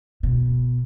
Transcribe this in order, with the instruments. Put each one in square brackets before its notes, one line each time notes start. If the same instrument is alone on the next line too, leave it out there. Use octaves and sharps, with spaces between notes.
[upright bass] B2